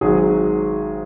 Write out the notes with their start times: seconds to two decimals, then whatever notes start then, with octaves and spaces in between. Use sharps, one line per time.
0.01 G#1 G#2 D#3 F#3 G#4